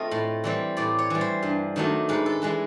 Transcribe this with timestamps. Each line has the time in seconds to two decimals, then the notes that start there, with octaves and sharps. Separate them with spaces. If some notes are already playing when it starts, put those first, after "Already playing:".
Already playing: A3 C4 F4 D#5
0.11 A2
0.44 E3 G3 C4
0.77 A2 D5
0.99 C#5
1.10 E3 G3
1.21 C5
1.43 G2
1.76 D#3 F#3 A3 D4
2.09 G#2 B4
2.26 A4
2.42 E3 G#3 B4